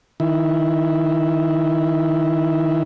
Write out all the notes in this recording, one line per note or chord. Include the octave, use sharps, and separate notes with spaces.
D#3 E4